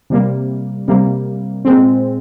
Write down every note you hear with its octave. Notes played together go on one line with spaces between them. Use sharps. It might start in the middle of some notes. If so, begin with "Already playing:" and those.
C3 G3 A#3
C3 G3 A#3
A#2 G#3 C4